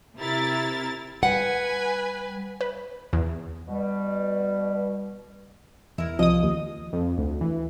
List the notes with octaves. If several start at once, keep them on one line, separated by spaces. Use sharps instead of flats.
C3 E4 A#4 A6
G3 B4 F#5 G#5
B4
E2
B2 G3
E2 E4 A#4
C2 F3 D#5 D#6
D#2
F2
D2
E3